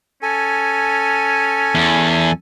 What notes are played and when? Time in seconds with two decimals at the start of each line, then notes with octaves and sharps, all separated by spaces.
0.22 C#4 A4 G#5
1.75 E2